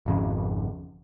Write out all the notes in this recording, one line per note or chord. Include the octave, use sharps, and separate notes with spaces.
G#1 F2 C#3